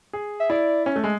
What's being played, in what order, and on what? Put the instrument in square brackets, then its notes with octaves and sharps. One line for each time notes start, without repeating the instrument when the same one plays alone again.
[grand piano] G#4
[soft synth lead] E5
[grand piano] E4 [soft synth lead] D5
[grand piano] C#4
A3
G#3